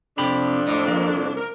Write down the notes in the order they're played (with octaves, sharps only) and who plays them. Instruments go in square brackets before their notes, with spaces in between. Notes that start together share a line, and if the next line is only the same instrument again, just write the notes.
[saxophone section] F2 D4 [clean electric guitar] C3 G4 B5
[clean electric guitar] A2
F3 A#3
C2
[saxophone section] A#4